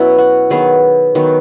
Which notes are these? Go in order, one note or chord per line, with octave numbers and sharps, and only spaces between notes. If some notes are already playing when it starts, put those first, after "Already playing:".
Already playing: B2 F#3 B3 C#4 E4
F#4
D#3 F#3 B3 G#4
D#3 F#3 B3